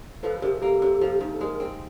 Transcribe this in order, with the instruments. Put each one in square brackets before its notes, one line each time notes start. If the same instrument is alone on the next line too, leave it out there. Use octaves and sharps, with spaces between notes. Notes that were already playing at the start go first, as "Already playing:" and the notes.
[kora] F3 [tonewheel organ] A4 B4
[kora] C3 [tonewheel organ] G#4 A#4
[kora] A#3 [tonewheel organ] G4 A4
[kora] C3
F3
G#2
[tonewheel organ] A4
[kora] G#3 [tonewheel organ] G#4 A#4
[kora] C4